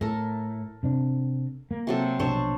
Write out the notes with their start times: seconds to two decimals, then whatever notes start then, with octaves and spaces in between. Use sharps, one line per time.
0.01 A2 A4 A#4
0.83 C3 C4 D4
1.71 A#3
1.87 C3 F#3 A4
2.19 A#1 B2 D4 C5 C#5